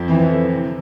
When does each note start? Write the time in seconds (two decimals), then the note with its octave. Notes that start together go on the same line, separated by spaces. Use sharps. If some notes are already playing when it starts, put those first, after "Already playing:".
Already playing: F2 F3
0.08 E3 C4
0.29 D3
0.51 C3